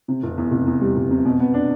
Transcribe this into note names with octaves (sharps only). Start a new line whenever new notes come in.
C3
F1
E2
F1
E2
G3
F1
C3
B2
B3
D4